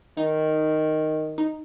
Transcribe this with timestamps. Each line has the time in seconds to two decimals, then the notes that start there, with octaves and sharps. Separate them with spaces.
0.17 D#3 D#4
1.38 D#4